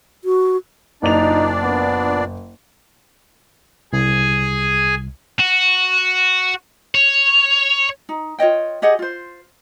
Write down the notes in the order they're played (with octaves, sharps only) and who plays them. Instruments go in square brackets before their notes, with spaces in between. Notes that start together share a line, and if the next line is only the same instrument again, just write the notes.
[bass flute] F#4
[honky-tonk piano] F#1 F7 [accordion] A#2 D4 D5 [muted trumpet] D#4
[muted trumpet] B3
[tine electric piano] C2 [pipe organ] G#4 G#5
[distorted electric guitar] F#4
C#5
[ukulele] D#4
F4 C#5 D#5 G5
G4 G#4 D#5 F#5
F4 C5